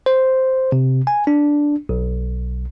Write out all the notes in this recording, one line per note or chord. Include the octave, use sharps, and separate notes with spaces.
C5
C3
G#5
D4
B1